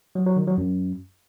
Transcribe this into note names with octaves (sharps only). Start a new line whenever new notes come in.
F#3
F#3
D#3
F#3
F#2